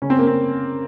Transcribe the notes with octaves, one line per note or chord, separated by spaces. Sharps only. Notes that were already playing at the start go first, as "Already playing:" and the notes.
C#3 C#4
C4
A#3
C4